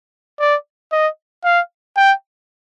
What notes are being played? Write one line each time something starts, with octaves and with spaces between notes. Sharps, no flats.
D5
D#5
F5
G5